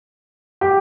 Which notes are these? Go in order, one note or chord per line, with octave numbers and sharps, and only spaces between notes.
G4